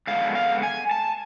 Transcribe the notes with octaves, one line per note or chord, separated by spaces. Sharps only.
D3 G#3 B3 D4 F5
F5
G#5
A5